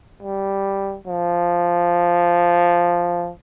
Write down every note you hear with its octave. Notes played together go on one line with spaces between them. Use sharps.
G3
F3